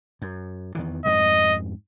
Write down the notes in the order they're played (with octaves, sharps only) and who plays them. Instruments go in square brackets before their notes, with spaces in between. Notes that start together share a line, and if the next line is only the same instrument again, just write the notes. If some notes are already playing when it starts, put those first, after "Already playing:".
[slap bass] F#2
E2 D#3 E3
[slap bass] F2 G#2 [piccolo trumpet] D#5